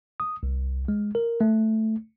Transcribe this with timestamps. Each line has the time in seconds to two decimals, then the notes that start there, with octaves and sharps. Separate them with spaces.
0.20 D#6
0.43 C2
0.88 G#3
1.15 A#4
1.41 A3